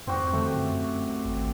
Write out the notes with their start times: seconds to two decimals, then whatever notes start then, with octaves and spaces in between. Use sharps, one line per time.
0.07 F2 C4 F#4 G4
0.33 D3 A3
0.56 F#2
1.26 G#1